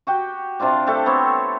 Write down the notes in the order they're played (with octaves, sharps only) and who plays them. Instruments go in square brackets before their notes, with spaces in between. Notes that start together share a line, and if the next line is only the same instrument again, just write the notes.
[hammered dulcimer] F#4 G4 G5
C3 D4 F4 D5
A3 D4 G4 A4
B3 C4 C#5